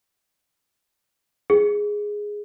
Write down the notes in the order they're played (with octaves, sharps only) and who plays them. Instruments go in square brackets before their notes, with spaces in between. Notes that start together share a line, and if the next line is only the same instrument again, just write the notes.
[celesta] G#4